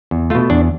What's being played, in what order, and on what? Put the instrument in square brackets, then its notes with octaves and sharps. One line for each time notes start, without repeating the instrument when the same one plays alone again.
[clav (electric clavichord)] E2
A3 F4
B2
E2 D4